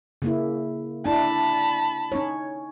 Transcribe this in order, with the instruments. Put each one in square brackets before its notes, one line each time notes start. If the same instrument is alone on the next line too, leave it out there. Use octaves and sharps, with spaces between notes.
[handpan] C#3 A#3 E4
[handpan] D4 E4 [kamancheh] A5 B5
[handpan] C#4 D#4 C#5